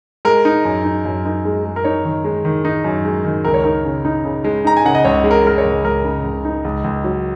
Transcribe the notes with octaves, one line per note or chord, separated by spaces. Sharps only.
G#3 A#4
D#4
F#2
D#4
F#2
D#4
G#3
G#3
A#4
D#4 C#5
D#3
G#3
D#3
D#4
F#2
G#3
D#3
C#2 A#4
C#5
D#4 A#4
C#3
D#4
C#3
G#3
D#4 A#5
G#5
C#3 F#5
D#5
C#2 C#5
G#3
A#4
G#3 A#4
C#5
C#2
C#2 A#4
C#3
C#2
D#4
C#2
C#2
F#3